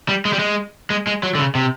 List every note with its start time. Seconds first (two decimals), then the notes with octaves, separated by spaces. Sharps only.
0.09 G3
0.25 G#3
0.33 G3
0.39 G#3
0.90 G#3
1.07 G#3
1.23 F#3
1.35 D3
1.39 C#3
1.55 C3